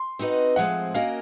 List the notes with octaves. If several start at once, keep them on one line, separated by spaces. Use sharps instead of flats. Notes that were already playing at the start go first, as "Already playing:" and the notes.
Already playing: C6
C4 D#4 F#4 B4 D#5
A2 F3 G#3 C4 F#5
A#3 C#4 F#4 A#4 D#5 F5